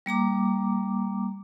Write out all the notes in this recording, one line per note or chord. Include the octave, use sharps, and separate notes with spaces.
G3 A#3 A#5 D6